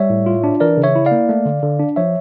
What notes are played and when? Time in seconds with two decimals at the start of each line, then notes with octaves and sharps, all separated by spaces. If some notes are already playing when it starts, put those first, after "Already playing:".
Already playing: G3 C#5 E5
0.10 A2
0.26 F4
0.44 D4
0.60 E3 A#4 D5
0.77 C#3
0.83 C#5 E5
0.96 E4
1.06 D5 F5
1.11 A#3
1.29 A3
1.46 D3
1.63 D3
1.79 D4
1.96 F3 C#5 E5